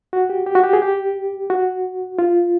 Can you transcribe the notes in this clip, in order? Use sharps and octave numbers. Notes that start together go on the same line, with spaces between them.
F#4
G4
G4
F#4
G4
G#4
G4
F#4
F4